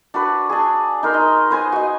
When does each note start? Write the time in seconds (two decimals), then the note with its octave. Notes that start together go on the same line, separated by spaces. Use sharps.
0.14 D4 F#4 B4
0.49 D4 G#4
1.03 D#4 A#4 C6
1.14 D#5
1.51 B4 C5 G#5 D#6
1.72 F#4 D#5